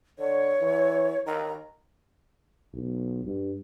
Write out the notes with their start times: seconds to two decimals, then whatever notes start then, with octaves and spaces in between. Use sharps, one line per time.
0.19 D3 C#5
0.60 E3
1.27 D#3 A#5
2.74 B1
3.24 G2